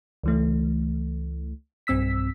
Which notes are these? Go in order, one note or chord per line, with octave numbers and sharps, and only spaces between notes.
C#2 E3 A3
B1 G2 C4 E6 B6